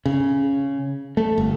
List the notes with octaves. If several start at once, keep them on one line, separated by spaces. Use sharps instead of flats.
C#3
A3
G1